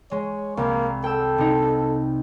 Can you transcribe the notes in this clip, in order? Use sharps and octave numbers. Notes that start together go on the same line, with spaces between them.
G#3 C#5
C2 A#3
A4 G5 E6
C3 D#4